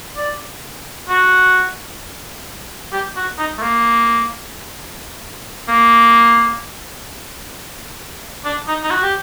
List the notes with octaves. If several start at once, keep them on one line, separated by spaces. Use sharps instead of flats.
D5
F#4
G4
F#4
D#4
A3
A#3
A#3
D4
D#4
D#4
F#4
G4